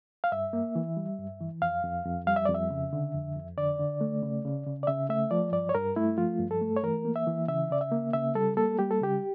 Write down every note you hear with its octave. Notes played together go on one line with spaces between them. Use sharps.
F5
G2 E5
A#3
E3
G3
G2
E3
F2 F5
F2
F2
G3 F5
E5
F2 D5
E5
C#3
D3
F2
F2
D3 D5
D3
A3
C#3
C#3
C#3
D5
C#3 E5
A3 E5
F3 D5
G2 D5
C#5
G2 A#4
A3 E4
F3 F4
G2
A4
A3
C#5
E3 A#4
A#3
E5
E3
C#3 E5
C#3 D5
E5
A#3
C#3 E5
G3 A4
A#3 A4
G3 G4
A4
C#3 G4